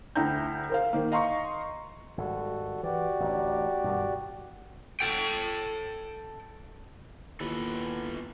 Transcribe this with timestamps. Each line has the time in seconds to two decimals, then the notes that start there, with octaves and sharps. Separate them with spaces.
0.16 D2 E4 G5 A#5 G6
0.70 A#4 C5 F5
0.93 D#3 A#3
1.12 D#5 F5 A#5 C6 C#6
2.17 G#1 G3 F#4 A4
2.83 E3 F#4 G4 D5
3.20 A1 D2
3.84 G2 B2 D#3
5.00 A4 G5
7.40 D#2 B3 E4 F4 A4 B4